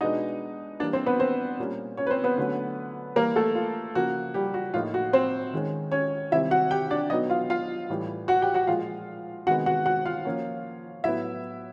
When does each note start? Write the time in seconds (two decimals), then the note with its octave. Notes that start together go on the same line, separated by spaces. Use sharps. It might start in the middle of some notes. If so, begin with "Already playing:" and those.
0.01 B2 G#3 B3 D4 D#4 D#5
0.80 E3 G3 A#3 D4 D5
0.93 C4 C5
1.06 B3 B4
1.19 C4 C5
1.59 A#2 G3 A#3 C#4
1.97 C#4 C#5
2.07 B4
2.11 C4 C5
2.24 B3 B4
2.38 D3 F#3 A3 C#4
3.16 E3 G3 A#3 A#4
3.36 A3 A4
3.55 F4
3.95 C#3 F3 A#3 F#4
4.34 G3 G4
4.54 F#4
4.74 A2 F3 A#3 D#4 F4
4.94 F#4
5.13 C4 C5
5.53 D#3 G#3 C#4
5.92 C#4 C#5
6.32 C3 D#3 G3 C4 E4 E5
6.51 F#4 F#5
6.71 G4 G5
6.91 D4 D5
7.10 B2 F#3 B3 D#4 D#5
7.30 F4 F5
7.50 F4 F5
7.90 A2 E3 G3
8.28 F#4 F#5
8.42 G4 G5
8.54 F#4 F#5
8.67 A#2 F3 G#3 F4 F5
9.47 C3 D#3 G#3 B3 F#4 F#5
9.66 F#4 F#5
9.86 F#4 F#5
10.05 F4 F5
10.25 F3 A#3 C#4
11.04 A2 F#3 B3 E4 E5